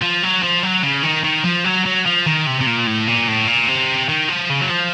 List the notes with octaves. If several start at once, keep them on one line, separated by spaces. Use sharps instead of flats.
F3
F#3
F3
F#3
C#3
D#3
D#3
F3
F#3
F#3
F3
D#3
C3
C3
A#2
A2
A#2
A2
A#2
C3
D#3
F3
C#3
F#3
F3